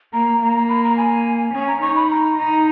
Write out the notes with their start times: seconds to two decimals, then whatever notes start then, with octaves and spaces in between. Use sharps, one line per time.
0.13 A#3 A#5
0.41 A#3
0.69 B5
0.84 A#5
0.97 G#5
1.54 C#4 G#5
1.68 A#5
1.82 D#4 C#6
1.96 B5
2.10 A#5
2.38 D#4